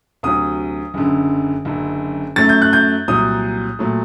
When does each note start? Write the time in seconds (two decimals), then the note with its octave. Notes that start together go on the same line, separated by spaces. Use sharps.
0.23 D2 C3 F#3 D#6
0.94 F#1 F#2 D3
1.65 F#1 F#2 D3
2.36 F#2 F#3 A3 A6
2.49 G6
2.62 F#6
2.73 G6
3.08 C2 A#2 F#3 D#6
3.79 A#2 F#3 A3